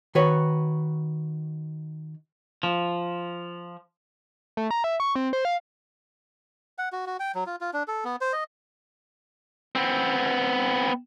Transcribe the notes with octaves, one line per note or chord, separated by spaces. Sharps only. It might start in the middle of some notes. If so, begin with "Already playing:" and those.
D#3 F#4 B4 C#5
F3
A3
A#5
E5
C#6
C4
C5
F5
F#5
F#4
F#4
G5
F#3
F4
F4
D4
A4
B3
C5
D#5
B3 C4